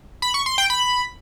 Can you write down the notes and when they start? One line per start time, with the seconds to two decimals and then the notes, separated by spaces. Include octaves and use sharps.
0.22 B5
0.34 C#6
0.46 C6
0.58 G5
0.70 B5